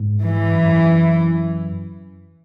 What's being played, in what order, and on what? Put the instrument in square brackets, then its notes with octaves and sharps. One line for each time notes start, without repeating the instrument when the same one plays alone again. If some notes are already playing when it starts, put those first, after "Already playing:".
Already playing: [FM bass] G#2
[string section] E3
[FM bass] F#2